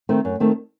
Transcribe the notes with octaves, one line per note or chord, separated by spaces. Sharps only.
D#3 A3 C4
F#2
D#3 A3 C4